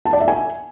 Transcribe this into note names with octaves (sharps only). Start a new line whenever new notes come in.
A5
D5
E5
G#5